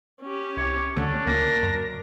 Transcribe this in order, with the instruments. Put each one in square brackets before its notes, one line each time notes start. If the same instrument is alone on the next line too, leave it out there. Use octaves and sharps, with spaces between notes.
[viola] C#4 G4
[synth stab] C2 [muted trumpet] C#5
[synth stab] D2 D3 A3 [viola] C#4 [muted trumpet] D4
[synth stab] D2 C#3 A#3 [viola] A#4 [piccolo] A#6
[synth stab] F#2